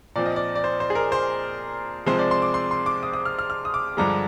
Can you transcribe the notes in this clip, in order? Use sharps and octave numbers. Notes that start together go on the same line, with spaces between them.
A#2 F3 C4 D5
D#5
D5
D5
C5
C5
G#4
A#4
C5
C3 F3 G#3 C4 C5
D5
C6
D6
C6
C6
D6
D#6
D#6
F6
F6
F6
D#6
D6
G2 D3 F3 G#3 A#5